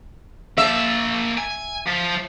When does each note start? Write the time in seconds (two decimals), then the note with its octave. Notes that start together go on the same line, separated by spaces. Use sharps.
0.58 A#3 E5 A5
1.37 G#5
1.87 F3